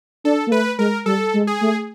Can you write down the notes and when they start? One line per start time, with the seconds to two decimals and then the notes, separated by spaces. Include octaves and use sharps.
0.24 D4 A4
0.47 A#3
0.52 A3 B4
0.78 G#3 A#4
1.06 G3 A4
1.34 G#3
1.47 G#4
1.61 A3